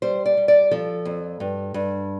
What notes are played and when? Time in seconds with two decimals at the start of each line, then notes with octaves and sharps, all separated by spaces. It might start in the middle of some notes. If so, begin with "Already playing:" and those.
0.02 G3 C5
0.26 D5
0.37 G3
0.48 D5
0.71 F3 A4
1.05 F2
1.40 G2
1.74 G2